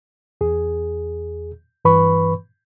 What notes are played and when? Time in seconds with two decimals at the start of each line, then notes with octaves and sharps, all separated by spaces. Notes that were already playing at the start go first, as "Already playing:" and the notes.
0.41 E2 G#4
1.85 G2 E3 B4 B5 C#6